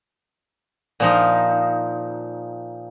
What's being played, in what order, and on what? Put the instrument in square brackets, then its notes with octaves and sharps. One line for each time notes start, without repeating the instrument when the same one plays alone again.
[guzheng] A#2 F3 D#4